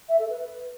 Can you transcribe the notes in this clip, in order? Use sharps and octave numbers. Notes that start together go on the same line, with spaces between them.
E5
A4
B4
B4